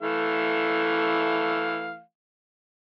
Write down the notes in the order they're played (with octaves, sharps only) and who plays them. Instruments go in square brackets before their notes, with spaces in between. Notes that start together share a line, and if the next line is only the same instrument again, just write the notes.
[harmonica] E3 A3 F5